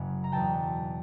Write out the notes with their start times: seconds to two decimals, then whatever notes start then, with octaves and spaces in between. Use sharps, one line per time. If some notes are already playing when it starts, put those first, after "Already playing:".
Already playing: F#1 F#2 C#3 F#3
0.24 A#5
0.32 E2 B2 F#3 G5 A5